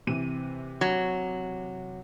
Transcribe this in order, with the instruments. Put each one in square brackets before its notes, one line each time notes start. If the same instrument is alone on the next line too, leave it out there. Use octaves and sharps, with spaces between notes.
[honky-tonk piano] C3 E3 D#7
[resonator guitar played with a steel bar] F#3